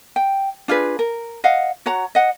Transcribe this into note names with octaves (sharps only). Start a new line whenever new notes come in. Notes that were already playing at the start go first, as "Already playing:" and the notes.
G5
D4 F4 G#4 B4
A#4
D#5 F5 F#5
F#4 C#5 F#5 A#5
D#5 F#5